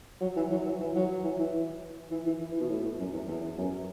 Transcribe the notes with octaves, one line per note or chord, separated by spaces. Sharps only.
F#3
E3
F#3
E3
E3
F#3
E3
E3
E3
E3
E3
E3
B2
A2
F#2
E2
E2
F#2